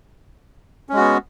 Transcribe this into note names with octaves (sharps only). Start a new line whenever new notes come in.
G#3 B3 C#4 F#4